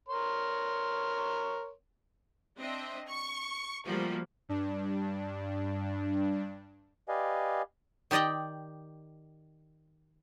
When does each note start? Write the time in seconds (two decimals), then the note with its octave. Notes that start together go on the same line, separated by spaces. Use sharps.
0.09 A#4 C#5 C6
2.58 C4 D4 D#5 E5
3.07 C#6
3.86 F3 G3 A3 A#3 F#4
4.49 G2 D4
7.09 G4 B4 D5 D#5 F5 G#5
8.11 D#3 G4 D5 D#5 G5